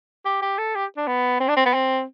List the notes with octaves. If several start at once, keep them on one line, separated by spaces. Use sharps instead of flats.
G4
G4
A4
G4
D4
B3
C4
D4
C4
B3
C4